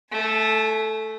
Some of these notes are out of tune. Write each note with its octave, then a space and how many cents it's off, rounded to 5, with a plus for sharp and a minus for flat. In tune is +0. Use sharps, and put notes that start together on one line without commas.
A3 +0 G#5 +45